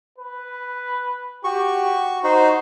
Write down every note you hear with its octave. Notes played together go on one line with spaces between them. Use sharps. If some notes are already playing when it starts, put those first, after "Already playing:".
B4
F#4 G4 C#6
D#4 F#4 C5